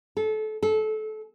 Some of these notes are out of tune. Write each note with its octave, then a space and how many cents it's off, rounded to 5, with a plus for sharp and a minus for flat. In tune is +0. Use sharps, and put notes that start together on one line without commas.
A4 -25
A4 -25